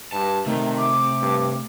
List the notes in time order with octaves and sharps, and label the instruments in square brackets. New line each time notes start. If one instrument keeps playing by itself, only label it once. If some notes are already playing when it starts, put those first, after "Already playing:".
[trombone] G2 [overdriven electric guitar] A5
[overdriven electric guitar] C3 [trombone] D#3 [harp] A3
[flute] D6
[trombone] G2